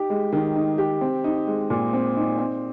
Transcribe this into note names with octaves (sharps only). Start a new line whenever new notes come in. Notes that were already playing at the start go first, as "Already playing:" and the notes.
Already playing: D#4 G4
G#3
D#3
D#4
G4
C4
D#4
G#3
A#2
C4
D#4
C4